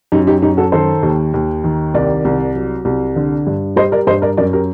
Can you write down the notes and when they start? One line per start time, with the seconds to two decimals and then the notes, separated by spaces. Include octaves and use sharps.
0.12 F#2 D#4 G4
0.27 D#4 G4
0.42 F#2 D#4 G4
0.57 F#4 A4
0.72 D#3 A4 C5
1.03 D#2
1.34 D#2
1.64 D#3
1.94 C2 A#4 D5
2.25 C2
2.55 F#3
2.85 C2
3.16 D3
3.47 G2
3.76 G3 C5 D#5
3.92 A#4 D5
4.07 G2 C5 D#5
4.22 A#4 D5
4.37 F#2 A#4 D5
4.53 G4 A#4